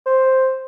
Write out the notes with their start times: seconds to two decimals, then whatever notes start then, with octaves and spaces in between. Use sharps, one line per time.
0.06 C5